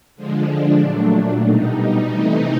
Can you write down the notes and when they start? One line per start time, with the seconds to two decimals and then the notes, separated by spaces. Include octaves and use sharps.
0.16 D3 F3 G#3
0.48 D4
0.80 A#2 F#3 A3
1.12 D4
1.44 B2 G3 D#4
1.76 D#4
2.08 C3 E3 A3 D#4